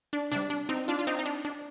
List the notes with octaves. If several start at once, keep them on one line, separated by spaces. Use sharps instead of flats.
D4
C3 G3 D4
D4
C4 D#4
D4 F4
F4
C4 D#4
D#4
D4
D4